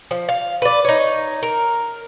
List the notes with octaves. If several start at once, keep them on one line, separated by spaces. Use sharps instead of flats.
F3
F5
B4 D5
D#4 C#5
A#4